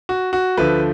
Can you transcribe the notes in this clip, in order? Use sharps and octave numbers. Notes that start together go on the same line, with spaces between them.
F#4
F#4
D2 D3 F3 A3 B4